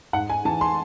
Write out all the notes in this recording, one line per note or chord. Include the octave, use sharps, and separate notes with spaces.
G#2 F#5
G#5
E3 A5
C6